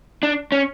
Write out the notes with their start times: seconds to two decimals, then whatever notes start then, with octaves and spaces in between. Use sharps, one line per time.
0.23 D4
0.52 C#4